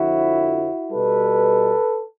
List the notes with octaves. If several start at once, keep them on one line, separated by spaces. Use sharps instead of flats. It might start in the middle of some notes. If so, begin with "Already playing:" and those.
Already playing: F2 D3 F3 E4 F#4
B2 G3 A4 B4